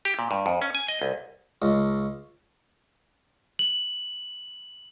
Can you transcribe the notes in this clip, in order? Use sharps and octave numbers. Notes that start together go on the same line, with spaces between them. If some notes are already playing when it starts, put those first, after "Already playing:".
G4
A#2
G2
F2
C#4
G#5
D#5
C2
C#2
F#7